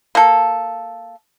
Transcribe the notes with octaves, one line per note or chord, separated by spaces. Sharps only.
A#3 A4